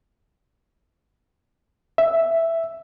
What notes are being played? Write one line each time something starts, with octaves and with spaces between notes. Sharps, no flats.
E5